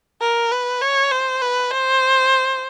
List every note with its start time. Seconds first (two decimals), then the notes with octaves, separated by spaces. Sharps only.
0.21 A#4
0.51 B4
0.81 C#5
1.11 C5
1.42 B4
1.71 C5